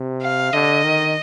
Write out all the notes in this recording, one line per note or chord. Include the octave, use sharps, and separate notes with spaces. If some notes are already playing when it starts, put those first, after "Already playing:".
Already playing: C3
F5
D3 D#5
D#3